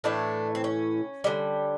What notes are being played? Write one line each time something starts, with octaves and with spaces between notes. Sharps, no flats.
A2 E3 A3 D4
C4
C#4
D3 G3